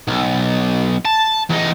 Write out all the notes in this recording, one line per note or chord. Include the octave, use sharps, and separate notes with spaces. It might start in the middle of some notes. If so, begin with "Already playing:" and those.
B1
A5
E2 D#4